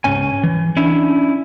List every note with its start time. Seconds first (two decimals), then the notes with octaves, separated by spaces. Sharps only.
0.04 C#2 G#2 C#4 G#5
0.44 E3
0.77 C#4 D4 E4